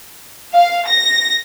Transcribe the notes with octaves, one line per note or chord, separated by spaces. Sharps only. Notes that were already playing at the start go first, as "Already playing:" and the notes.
F5
A#6